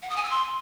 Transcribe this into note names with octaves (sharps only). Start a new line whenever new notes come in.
F#5
D#6
G#5
E6
C6